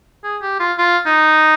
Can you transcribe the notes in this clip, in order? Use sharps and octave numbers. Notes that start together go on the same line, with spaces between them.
G#4
G4
F4
F4
D#4